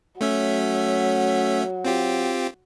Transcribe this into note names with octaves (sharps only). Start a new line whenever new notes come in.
F#3 A3 C#4 E5
C4 F4 G4